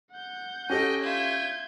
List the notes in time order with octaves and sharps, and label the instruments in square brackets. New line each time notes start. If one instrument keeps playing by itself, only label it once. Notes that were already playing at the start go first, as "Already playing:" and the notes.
[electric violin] F#5 G6
[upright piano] C#4 G4 A4 [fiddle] D#5 G5
[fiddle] F4 E5 [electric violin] G6 G#6